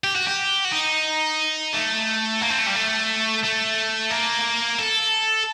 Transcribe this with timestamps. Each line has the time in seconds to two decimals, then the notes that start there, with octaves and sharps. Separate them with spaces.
0.04 G4
0.15 F#4
0.27 G4
0.65 F#4
0.72 D#4
1.74 A3
2.42 A#3
2.50 C4
2.59 A3
2.66 G3
2.75 A3
3.43 A3
4.11 A#3
4.79 A4